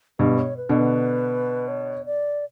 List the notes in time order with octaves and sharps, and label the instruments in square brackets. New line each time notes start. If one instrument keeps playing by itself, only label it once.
[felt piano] G2 B2 [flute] B4
[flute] C#5
B4
[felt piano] B2 D3
[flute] B4
C#5
D5